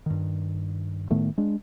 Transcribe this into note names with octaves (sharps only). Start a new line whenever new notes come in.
G2 D#3
A2 D#3 A3 B3
G#3 D4